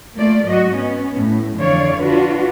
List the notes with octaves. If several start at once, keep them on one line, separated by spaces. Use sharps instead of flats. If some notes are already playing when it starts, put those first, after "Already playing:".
A3 A#3 F4 D5
G#2 F#3 F#4 D#5
B3 C#4
A2
F2 D3 E3 C#5 D5 F5
D4 F4 F#4 B4